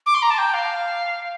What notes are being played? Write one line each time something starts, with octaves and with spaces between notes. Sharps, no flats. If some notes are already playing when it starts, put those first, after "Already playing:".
D6
C6
A#5
A5
G5
F5